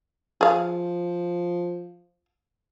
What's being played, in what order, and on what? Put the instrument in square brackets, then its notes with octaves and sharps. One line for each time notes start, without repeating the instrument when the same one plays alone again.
[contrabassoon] F3 [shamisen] G#4 F5